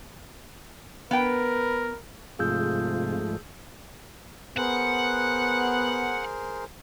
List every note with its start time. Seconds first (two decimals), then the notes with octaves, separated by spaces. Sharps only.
1.11 B3 A#4 B4 G5
2.39 G#2 C3 F3 A3 F4 G#4 E6 G6
4.57 B3 G#4 A#4 C5 F#5